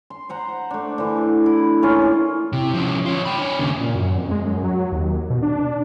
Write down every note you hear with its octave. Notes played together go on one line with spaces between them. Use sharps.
C6
C5 F#5 A#5
A3 D4
D3 E3
E4
E3 A#3 C#4 F4
C3
F3 C#4
F4 C#5
G5 B5
D4 C#5
D#2 C#3
A#2
F#2
F2
G#3
F#2
F#3
D#2
B2
D4